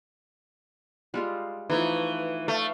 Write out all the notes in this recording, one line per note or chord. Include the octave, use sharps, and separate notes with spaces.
G3 G#3 F4
E3 F3 A3 D#4
A3 F5